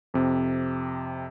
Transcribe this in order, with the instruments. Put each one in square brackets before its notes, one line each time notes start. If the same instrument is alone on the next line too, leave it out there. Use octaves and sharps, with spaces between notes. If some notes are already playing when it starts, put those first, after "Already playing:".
[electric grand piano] F2 C3